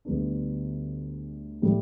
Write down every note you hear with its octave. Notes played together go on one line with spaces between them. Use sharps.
D2 D3 G3 B3 D4
A2 G3